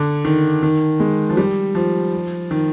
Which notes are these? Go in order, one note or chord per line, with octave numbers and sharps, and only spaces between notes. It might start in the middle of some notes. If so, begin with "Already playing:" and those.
Already playing: D3
D#3
D#3
G#3
F3
G3
F3
D#3